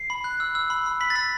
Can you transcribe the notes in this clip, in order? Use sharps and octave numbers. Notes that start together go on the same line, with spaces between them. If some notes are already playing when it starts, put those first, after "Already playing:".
Already playing: C7
B5
F#6
E6
E6
B5
B5
B5 B6
A6
E6 B6